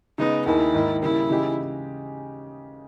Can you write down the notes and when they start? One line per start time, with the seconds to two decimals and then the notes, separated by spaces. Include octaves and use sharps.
0.18 C#3 G#3 B3 D#4
0.46 D#2 D#3 A#3 D#4 E4 G#4
0.74 G#2 D#3 A#3 D#4
1.02 C#3 G3 A#3 E4
1.29 C#3 E3 G#3 D#4 G4